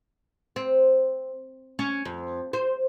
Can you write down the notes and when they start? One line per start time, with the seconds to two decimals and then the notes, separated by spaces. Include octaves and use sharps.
0.56 C4
1.79 C#4
2.05 F2
2.53 C5